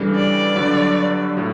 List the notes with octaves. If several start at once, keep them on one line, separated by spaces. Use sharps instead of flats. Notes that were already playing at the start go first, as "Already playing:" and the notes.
Already playing: C#3 E3 G3 D4 A4
D5
G2 D3 F#3
A2 F#3